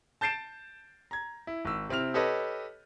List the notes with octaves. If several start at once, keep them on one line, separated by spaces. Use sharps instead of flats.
A5 G6 A6 C7 D7 E7
A#5 G#6
E4
G#1 E6
C3 C4 E4 F6 F7
G4 A4 B4 C#5 D#5